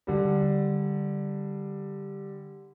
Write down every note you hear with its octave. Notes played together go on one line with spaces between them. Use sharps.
D3 G3